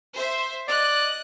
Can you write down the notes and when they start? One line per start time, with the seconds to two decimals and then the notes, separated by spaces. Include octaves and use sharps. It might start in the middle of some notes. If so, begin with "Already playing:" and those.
0.14 C5 E5
0.68 D5 D#5 F#6